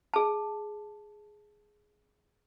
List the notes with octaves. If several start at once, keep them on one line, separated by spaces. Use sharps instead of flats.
G#4 A5